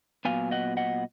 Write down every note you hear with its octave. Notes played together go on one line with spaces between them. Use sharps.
A#2 F#3 B3 F5 G#5
D#5 F#5
D#5 F#5